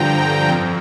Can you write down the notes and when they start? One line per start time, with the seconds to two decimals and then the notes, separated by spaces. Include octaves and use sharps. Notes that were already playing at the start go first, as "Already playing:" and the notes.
Already playing: G2 D3 F3 G5 A#5
0.49 F2